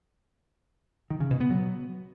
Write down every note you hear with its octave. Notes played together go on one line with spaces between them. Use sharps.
D#3
C#3
B2
B3
F#3